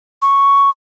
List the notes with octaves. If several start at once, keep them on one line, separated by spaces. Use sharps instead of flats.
C#6